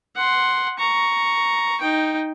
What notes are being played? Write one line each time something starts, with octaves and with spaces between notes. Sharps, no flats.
F#5 C6
A#5 C#6
D#4 G5